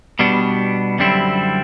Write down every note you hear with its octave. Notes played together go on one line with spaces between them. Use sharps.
B2 G3 B3 D4
F#2 D3 G3 C4 E4